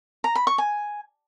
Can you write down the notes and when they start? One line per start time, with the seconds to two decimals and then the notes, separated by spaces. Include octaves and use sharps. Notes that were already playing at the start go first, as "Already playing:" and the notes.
0.24 A#5
0.35 B5
0.47 C#6
0.58 G#5